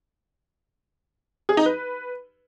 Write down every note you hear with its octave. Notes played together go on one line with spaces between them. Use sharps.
G#4
D#4
B4